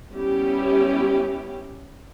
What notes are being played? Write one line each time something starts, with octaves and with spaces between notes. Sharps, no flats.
G3 B3 C#4 E4 G4